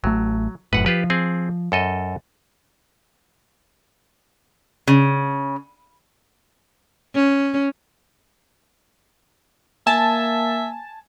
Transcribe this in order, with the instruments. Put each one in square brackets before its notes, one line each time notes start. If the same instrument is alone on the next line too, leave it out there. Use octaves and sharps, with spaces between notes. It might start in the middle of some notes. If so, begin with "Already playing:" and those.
[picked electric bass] A1 A3 [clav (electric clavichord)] F#3
[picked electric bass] F1 F#2 A2 [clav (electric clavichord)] B4 F#5
[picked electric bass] F3 [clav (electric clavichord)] F4 G4 B4
[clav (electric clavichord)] C4 G#4
F#2 A4 D#5
[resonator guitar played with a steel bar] C#3
[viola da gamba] C#4
[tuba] A#3 [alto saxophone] E5 [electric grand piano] G#5 [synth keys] A5